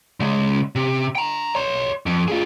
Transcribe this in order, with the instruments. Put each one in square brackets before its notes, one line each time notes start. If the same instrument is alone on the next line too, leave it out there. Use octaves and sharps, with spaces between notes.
[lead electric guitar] C#3 G#3
C3
G5 A#5
C#5 C6
F2
F4 G#4